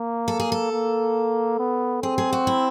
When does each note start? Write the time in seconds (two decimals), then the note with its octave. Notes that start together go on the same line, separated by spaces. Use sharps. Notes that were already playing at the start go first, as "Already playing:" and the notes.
Already playing: A#3
0.28 A4
0.40 G#4
0.52 A4
0.72 A#3
1.59 B3
2.03 C4 G#4
2.18 G#4
2.33 F#4
2.47 E4